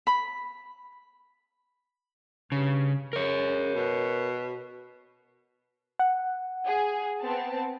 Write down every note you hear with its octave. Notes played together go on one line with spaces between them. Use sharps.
B5
G2 C#3
C#3 A#4 C#5
B2
F#5
G#4
B3 C4 A5